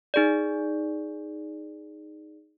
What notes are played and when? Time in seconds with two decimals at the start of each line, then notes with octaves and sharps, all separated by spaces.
0.14 D#4 G#4 D5